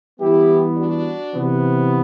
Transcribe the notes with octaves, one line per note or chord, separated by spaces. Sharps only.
E3 G3 B3 E4 G4
D4 F#4
C3 E3 B3